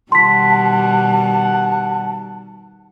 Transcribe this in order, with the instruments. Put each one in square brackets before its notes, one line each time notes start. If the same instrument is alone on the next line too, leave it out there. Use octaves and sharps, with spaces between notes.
[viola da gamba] B2 D#3 G3 [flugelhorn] F#5 [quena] A5 [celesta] C6 B6